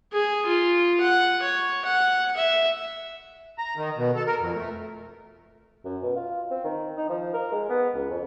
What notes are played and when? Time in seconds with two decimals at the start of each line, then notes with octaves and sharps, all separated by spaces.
0.13 G#4
0.46 F4
1.01 F#5
1.42 C#5
1.85 F#5
2.36 E5
3.58 A#5
3.76 D#3
3.97 B2
4.16 A4
4.27 A#4
4.40 F2
4.55 A3
5.85 F#2
6.02 B2
6.16 F4
6.50 C4
6.64 D#3
6.97 D#4
7.09 F3
7.34 A#4
7.52 G#3
7.70 B3
7.94 C#2
8.10 F2